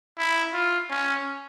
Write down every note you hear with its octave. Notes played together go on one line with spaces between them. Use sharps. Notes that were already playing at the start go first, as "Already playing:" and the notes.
E4
F4
C#4